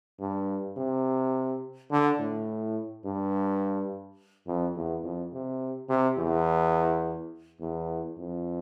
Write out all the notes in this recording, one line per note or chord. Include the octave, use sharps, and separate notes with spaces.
G2
C3
D3
A2
G2
F2
E2
F2
C3
C3
E2
E2
F2